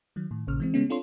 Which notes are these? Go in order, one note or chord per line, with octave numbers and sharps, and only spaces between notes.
D#3 F#3
A2 D#3
A1 A#2 C#3 F6
E3 G#3 C4
C#3 G3 G#3 B3 C#4
C4 D4 F4 A4 C#5 C6